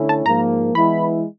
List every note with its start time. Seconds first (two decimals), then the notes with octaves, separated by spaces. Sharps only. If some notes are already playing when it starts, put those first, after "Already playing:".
Already playing: D3 A3 C#4 E4
0.09 A5
0.26 G#2 F3 A#3 A#5
0.74 E3 G#3 B3 E4 B5